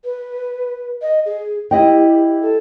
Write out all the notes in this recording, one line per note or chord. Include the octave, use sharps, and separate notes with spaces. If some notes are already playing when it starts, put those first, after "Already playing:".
B4
D#5
G#4
E4 G4 D#5 G5
A4